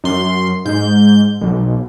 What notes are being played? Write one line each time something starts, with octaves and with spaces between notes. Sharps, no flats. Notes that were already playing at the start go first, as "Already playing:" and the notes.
F#2 C6
G#2 G6
B1